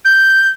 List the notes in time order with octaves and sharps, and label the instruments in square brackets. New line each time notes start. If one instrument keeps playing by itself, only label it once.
[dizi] G6